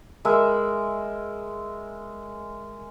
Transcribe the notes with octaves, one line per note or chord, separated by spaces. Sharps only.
G#3 A#4 E5 B5